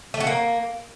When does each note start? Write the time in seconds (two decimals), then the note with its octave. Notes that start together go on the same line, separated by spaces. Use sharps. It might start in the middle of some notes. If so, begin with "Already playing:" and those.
0.14 A3
0.20 F#4
0.27 A#3